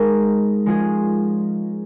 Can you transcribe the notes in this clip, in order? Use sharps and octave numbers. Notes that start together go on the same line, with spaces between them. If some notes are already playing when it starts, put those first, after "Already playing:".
Already playing: G#3 D#4 A#4
F3 G#3 C#4 F4 G#4